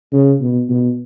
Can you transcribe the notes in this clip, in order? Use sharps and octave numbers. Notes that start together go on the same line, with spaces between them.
C#3
B2
B2